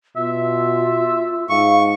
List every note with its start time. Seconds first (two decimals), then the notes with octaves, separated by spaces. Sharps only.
0.17 B2 F4 E5
1.49 G#2 F5 C#6